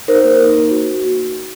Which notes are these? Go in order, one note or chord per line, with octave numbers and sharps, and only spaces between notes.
D#4 A#4 C5
A#3
D#4
A#3
F#4